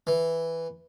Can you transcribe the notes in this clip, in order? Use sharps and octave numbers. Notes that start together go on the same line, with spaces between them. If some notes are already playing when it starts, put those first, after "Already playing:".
E3